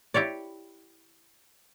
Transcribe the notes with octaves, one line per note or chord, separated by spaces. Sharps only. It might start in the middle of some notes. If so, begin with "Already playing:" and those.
E4 G4 C#5 D5